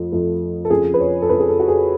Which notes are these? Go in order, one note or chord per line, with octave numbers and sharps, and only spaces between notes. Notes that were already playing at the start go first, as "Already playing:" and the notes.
Already playing: F2 F3 A3
F2 F3 A3
A4
F2 C#3 F3 G#4
B4
C#5
A4
F2 C#3 F3 B4
G#4
A4
F#4
G#4